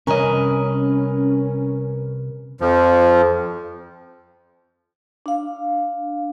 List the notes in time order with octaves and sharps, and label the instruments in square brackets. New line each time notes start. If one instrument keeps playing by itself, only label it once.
[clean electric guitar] C2 D#5 [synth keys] C#4 [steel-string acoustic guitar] A#4 B4
[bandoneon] F2 F3
[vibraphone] D4 F5